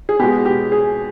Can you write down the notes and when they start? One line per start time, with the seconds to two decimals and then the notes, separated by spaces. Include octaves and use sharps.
0.09 G#4
0.20 B2 G#3 B3 G4
0.46 G4
0.72 G#4